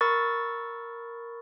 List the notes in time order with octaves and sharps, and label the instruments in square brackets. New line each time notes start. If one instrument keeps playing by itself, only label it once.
[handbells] A#4 B5 C#6 E6 A6